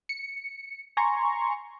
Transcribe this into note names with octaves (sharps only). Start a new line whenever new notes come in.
C#7
G#5 A#5 C6 C#6